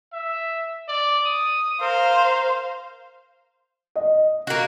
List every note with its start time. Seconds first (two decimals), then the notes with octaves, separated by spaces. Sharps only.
0.13 E5
0.88 D5
1.26 D#6
1.81 A#4 C5 F5
3.96 D#5
4.47 A#3 F#4